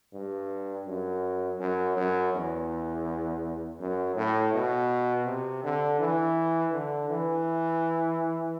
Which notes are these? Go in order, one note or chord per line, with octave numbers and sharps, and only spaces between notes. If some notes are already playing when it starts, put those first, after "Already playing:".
G2
F#2
F#2
F#2
E2
F#2
A2
B2
C3
D3
E3
D3
E3